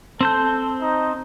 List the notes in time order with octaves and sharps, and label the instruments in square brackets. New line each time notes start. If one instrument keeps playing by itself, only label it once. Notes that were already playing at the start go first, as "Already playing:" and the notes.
[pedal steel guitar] C4 C5 G6 [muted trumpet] A4
[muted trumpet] D#4